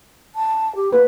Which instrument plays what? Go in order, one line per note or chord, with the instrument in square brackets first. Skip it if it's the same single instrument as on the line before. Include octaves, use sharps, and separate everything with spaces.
[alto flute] A5
G4
[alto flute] A#3 [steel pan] B4